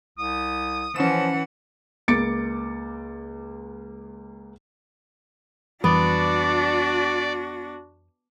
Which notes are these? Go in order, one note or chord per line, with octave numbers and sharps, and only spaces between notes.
C2 D#6
E3 F3 C#4 F#5 E7
C#2 A#3 D6 A6 C#7 D7
F2 E3 G3 B3 D4 F#4 D5